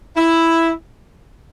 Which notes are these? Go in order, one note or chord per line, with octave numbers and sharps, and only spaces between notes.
E4